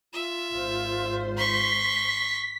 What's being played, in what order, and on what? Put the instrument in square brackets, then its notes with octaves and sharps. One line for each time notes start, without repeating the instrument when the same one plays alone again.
[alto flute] F4 [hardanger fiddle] E5
[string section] G#1 C5
[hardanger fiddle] C6 C#6 [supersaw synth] B6